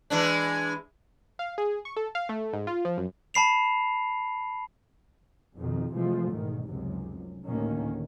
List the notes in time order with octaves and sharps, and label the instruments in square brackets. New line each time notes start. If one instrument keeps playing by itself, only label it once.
[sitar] E3 G#3 D4
[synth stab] F5
G#4
C#6
A4
F5
A3
G#2
F4
F3
F#2
[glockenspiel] A5 B5 C7 F7
[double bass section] F2 B2 D#3
C3 E3 F3 G#3 A3
E2 G#2 B2 D#3
F1 C#2 F#2 C3
A1 D2 A#2 D#3 A#3 C#4